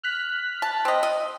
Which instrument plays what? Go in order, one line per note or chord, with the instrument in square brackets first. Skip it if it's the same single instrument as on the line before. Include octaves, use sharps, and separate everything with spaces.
[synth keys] F6 F#6 B6
[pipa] A5
C4 D#5
D#5